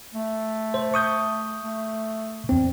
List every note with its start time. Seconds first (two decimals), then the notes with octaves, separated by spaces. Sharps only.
0.14 A3
0.74 C5
0.94 C#6 D#6 G6
1.63 A3
2.49 E2 C4